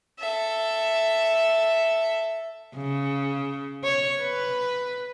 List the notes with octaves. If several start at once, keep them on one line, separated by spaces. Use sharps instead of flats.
A4 E5
C#3
C#5
B4